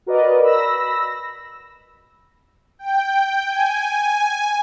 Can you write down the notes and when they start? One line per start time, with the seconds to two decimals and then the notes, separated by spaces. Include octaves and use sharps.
0.06 F#4 A#4 B4 D5 D#5
0.43 B5 E6 A#6
2.79 G5
3.47 G#5